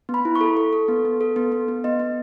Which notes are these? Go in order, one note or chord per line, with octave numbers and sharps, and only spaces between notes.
B3
B5
E4
C#6
A4
A4
A4
B3
B3
A4
B3
B3
B3
B3 D#5
B3